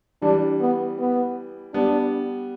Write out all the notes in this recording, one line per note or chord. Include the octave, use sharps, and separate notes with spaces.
E3 G3 D4
B3
B3
G3 B3 D4